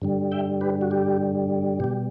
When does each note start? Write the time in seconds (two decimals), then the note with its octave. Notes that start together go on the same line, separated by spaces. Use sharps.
0.02 G2 D3 G3
0.32 E5 G5
0.61 G4 B4
0.81 F#4
0.91 G4
1.80 B2 G3 G4